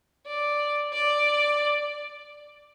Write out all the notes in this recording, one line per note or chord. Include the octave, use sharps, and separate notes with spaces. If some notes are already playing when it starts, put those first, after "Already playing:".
D5
D5